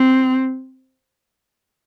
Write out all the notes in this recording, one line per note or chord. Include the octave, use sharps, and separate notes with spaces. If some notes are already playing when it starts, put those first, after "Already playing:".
Already playing: C4